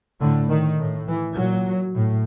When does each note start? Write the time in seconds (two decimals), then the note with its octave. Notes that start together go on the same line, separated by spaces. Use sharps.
0.21 A2 D3
0.49 D#3
0.79 A2
1.08 E3
1.36 A#2 F#3
1.94 A2